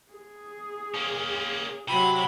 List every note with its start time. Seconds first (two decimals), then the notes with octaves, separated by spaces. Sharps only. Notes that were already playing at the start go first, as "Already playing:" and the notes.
0.13 G#4
0.94 A#3 C#4
1.88 C3 F#3 F#4 B5